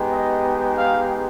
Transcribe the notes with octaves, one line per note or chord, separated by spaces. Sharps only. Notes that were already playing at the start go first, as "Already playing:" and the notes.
Already playing: G#3 B3 D#4 G4
D#5
F5